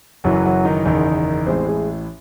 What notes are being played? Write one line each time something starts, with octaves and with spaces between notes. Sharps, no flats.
F#1 F#2 E3 F#3 F#4
F#3 F#4
D#3 D#4
F#1 E2 D#3 D#4
A1 A2 G#3 C4 C5
G#3 G#4